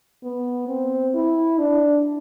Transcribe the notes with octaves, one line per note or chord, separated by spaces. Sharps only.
B3
C4
E4
D4